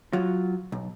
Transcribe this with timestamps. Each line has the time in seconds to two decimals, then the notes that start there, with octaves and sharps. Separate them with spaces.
0.13 F#3 F4
0.72 B1